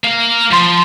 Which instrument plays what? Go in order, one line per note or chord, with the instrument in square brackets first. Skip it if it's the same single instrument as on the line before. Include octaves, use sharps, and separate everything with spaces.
[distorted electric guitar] A#3 F5
[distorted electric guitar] F3 [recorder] C6